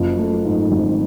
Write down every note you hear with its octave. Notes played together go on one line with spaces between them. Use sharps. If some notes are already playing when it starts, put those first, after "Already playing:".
Already playing: F#1 F3
A3
G#2
G#1